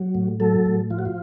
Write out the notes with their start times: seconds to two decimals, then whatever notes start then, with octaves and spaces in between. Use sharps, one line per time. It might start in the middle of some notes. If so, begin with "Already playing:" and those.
Already playing: F#3
0.15 A2
0.40 F#3 A4
0.66 A2
0.90 F3 F4
0.99 F#4
1.05 F4